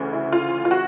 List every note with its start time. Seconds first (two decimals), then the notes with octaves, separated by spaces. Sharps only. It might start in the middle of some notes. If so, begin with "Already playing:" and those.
Already playing: D2 C#3 E3
0.13 E4
0.32 F4
0.65 F4
0.71 F#4